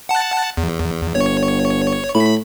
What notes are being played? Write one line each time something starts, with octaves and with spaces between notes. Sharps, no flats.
F#5 A5
E2
G1 C#5
A2 B5